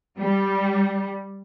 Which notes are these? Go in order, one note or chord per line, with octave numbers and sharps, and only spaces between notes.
G3